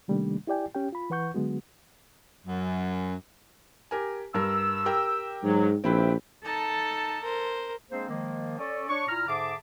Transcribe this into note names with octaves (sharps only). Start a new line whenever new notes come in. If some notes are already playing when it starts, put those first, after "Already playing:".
C3 D#3 G3 A3 A#3 D4
E4 G4 D5 G5 G#5
C#4 G4 G5
F4 B5
E3 B4 F#5 C#6 G6
D3 F#3 G#3 B3 F#4
F#2
G4 A#4 G#5
G2 G3 A#4 E6
G4 A#4 G5
G#2 F#3
A#1 F3 C4 E4 B4 E5 G5
D#4 A4 A5
A#4 C5
G#3 A#3 C4 D4 G#4 C5
D#3 F3 G#3 A#3
C#4 A4 D5
D4 C#5 C#6
A#2 E4 A#5 F6
G#2 D3 G#4 E5 A5 D6